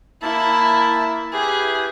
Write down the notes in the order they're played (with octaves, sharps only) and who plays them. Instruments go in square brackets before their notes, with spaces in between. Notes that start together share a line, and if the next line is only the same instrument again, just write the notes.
[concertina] A#3 E5 A5 [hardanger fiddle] E4
[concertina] E4 G4 B4 [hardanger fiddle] G#4